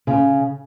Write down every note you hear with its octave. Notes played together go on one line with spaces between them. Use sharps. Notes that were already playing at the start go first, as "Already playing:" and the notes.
C#3